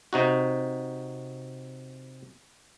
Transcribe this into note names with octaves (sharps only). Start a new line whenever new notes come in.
C3 D#4 F#4